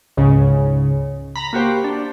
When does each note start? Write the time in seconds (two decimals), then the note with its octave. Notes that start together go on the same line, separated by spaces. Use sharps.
0.17 C#2 G#2 C#3
1.36 A#5 B5
1.53 A#3 F#4 G4 C5
1.84 D4